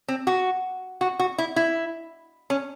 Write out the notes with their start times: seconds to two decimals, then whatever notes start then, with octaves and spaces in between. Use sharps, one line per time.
0.08 C4
0.27 F#4
1.01 F#4
1.19 F#4
1.38 E4
1.56 E4
2.50 C#4